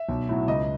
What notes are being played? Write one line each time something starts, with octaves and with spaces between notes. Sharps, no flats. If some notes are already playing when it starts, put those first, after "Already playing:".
Already playing: E5
B1
A2 F#3
C#2 D#5